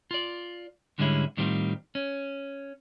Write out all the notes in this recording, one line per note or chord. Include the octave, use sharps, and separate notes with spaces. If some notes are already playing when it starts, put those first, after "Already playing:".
F4 D5
G#2 D3 G3 G#3 C#4 E4
A2 D#3 G3 C4 F4
C#4